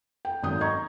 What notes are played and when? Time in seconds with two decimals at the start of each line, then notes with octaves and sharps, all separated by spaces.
0.25 G5
0.43 G#1 F#2 D#6 G6
0.61 D#5 A#5 C#6 G#6